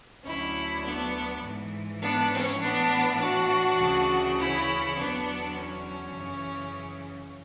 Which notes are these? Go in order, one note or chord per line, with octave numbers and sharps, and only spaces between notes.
D2 D3 F#3 C#4 E4
B3 D4
G#2 E3
B3 D4
C#4
A2 E3 B3 D4
D4 F#4
D2 C#3 E3
C#4 E4
E2 D3 F#3 B3 D4
C#4
F#2 C#3 E3